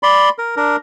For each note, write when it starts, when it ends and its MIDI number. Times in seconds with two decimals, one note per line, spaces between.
0.03 0.29 74
0.03 0.29 83
0.03 0.29 84
0.38 0.56 70
0.56 0.76 62
0.56 0.76 70